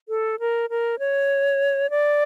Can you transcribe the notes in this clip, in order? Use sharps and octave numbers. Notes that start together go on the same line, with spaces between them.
A4
A#4
A#4
C#5
D5